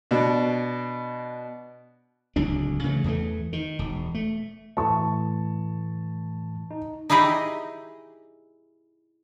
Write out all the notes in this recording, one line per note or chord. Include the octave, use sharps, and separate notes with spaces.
B2 D4
D1 C#2 F#3 D4
C#3 E3 F#3 A3
E2 E3 A3
D#3
E1
A3
A2 E3 A3 A5 C#6
D#4
D#4 E4 G4 G#4 D#5